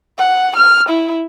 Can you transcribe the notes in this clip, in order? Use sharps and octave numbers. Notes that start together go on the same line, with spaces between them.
F#5
F6
E4